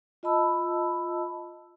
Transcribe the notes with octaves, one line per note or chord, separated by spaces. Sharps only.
F4 D#5 A5 B5 E6